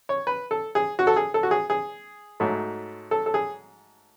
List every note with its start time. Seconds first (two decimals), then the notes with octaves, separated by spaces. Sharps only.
0.09 C#5
0.27 B4
0.51 A4
0.75 G#4
0.99 F#4
1.07 A4
1.16 G#4
1.34 A4
1.43 F#4
1.51 G#4
1.70 G#4
2.40 G#2 F#3 A3
3.11 A4
3.26 A4
3.34 G#4